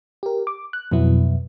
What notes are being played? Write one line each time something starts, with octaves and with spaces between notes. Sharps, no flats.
G4 A#4
D6
F#6
F2 B2 F#3 B3 E4